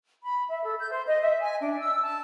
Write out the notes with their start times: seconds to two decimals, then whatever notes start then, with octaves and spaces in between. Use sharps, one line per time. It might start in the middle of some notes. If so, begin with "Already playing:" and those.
0.24 B5
0.48 E5
0.63 A4
0.80 G6
0.91 C5
1.05 D#5
1.22 E5
1.41 G#5
1.61 D4
1.79 E6
2.02 A5